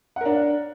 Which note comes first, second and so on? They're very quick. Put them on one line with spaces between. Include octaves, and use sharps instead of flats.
F#5 A#4 D4